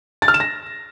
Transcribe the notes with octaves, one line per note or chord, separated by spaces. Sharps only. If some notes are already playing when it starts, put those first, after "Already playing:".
A6
F6
E7
A#6